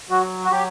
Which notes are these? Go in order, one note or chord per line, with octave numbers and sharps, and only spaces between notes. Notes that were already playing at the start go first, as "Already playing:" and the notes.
F#3 F#4
F#4
F#3 G4